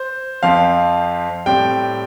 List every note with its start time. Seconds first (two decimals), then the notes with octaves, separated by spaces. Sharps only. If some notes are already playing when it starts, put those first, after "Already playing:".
Already playing: C5
0.43 F2 F3 C4 F5
1.46 A2 G3 C4 G5